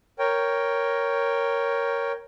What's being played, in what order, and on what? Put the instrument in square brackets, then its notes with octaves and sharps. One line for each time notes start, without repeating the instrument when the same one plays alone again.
[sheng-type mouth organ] A#4 C#5 G5